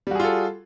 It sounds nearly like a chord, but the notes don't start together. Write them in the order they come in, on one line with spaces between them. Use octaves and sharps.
G3 F#4 G#4 F4 A4